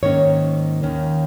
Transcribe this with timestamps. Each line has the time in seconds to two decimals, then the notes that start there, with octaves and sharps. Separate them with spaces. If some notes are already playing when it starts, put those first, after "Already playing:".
0.03 G#2 D#3 A#3 C#4 C#5
0.83 D#2 D#3 C#4